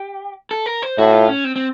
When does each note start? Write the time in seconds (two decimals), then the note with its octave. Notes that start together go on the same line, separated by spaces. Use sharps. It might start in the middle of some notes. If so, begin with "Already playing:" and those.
Already playing: G4
0.51 A4
0.66 A#4
0.82 C5
0.98 A2 F#4
1.13 F4
1.28 C#4
1.44 C4
1.56 C4